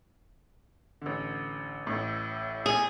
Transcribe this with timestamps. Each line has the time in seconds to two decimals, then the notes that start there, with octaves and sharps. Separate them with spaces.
1.02 A1 D3
1.87 A1 A2
2.66 G#4